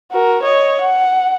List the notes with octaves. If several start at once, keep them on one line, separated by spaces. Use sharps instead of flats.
F#4 A#4
C#5 D#5
F#5